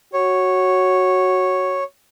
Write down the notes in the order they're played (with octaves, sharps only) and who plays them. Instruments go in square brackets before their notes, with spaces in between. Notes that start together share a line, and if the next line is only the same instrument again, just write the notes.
[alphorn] F#4 [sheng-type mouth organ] C#5